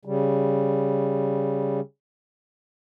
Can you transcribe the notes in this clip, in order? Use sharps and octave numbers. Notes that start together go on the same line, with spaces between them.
C#3 G3